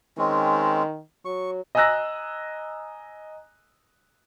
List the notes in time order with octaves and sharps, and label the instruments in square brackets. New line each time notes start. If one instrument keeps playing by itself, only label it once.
[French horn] D#3 [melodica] G#3 C4 C#4
[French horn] F#3 [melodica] C#6
[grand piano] D#5 G#5 A#5 E6 F#6 A#6